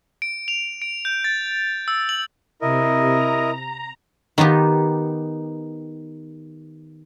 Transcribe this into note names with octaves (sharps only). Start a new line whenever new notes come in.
D7
F7
D7
G6
A6
E6
F#7
C3 E4 A#4 D#5
A#5
D#3 B3 D#4 G4